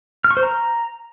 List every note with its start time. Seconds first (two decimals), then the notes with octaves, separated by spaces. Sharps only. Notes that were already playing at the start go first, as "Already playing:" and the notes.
0.24 F6
0.31 C#6
0.37 C5
0.43 A#5